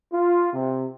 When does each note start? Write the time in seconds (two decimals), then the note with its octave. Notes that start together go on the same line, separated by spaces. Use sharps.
0.12 F4
0.53 C3